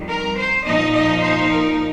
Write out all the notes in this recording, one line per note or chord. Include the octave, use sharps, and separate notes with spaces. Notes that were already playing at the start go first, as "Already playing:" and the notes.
Already playing: F2 D#3 G3
A#4
C5
A#2 F3 D#4 D#5
D#5
C5
A#4